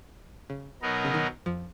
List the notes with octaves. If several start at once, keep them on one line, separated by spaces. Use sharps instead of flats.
C#3
B2 F#3 B3 D#4 A#4
C#3
D#3
F2 F3